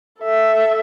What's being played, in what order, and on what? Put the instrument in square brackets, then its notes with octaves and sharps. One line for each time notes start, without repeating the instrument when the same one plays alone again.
[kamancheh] A4 E5